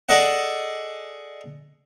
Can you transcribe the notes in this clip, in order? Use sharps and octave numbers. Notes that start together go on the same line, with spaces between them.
G#4 A4 D5 D#5 F#5